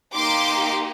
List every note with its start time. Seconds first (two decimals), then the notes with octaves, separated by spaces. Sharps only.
0.15 A#3 D#4 G4 C6 D6